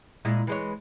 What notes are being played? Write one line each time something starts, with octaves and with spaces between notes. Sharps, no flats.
A#2 G#3 E4
E3 G#3 C#5